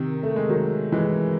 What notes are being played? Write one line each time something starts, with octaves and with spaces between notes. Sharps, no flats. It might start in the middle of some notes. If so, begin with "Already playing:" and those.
Already playing: C3 D#3
A3
G#3
D#3 F#3
E3 G#3